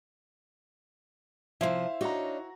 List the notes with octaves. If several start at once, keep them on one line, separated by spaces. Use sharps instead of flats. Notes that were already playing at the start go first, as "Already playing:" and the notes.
C3 F3 E4 C5 E5 F5
D4 D#4 F#4 C#5 A#5